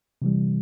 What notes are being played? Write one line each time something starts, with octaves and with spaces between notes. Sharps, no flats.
C3 E3 G3